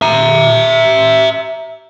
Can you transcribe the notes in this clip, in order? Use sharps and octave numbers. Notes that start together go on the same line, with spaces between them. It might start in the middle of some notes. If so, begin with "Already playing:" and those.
E5 A#5